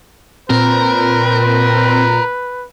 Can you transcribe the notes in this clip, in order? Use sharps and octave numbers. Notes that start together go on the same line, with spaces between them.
A#2 C4 A#4 B4